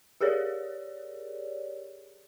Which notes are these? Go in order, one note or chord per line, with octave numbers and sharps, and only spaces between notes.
G4 G#4 A#4 C#5 D5